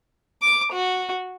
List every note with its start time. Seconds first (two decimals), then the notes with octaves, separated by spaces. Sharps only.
0.43 D6
0.73 F#4